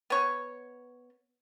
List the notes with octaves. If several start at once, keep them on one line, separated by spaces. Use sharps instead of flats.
B3 C#5